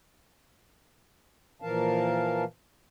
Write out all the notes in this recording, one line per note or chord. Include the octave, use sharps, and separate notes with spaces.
A#2 E3 F3 A#4 F5 A5